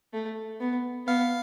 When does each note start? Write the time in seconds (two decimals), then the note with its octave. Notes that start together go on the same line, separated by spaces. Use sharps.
0.13 A3
0.60 B3
1.07 B3 F5